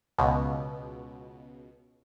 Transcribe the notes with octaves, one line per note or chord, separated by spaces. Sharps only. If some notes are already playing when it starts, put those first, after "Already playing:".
C#2 B2